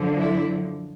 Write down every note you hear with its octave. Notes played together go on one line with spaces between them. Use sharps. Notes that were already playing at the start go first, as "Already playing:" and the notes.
Already playing: F#2 D3 F3
D4 E4